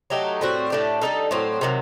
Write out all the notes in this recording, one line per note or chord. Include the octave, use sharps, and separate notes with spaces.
F#3 A3 D#4 G4
A2 G3 C4 F#4
A2 A3 D4 G4
G3 A#3 D#4 A4
A2 F#3 C4
C3 D#3 F#3